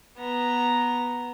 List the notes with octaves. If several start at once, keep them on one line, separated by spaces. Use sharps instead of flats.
B3 A#5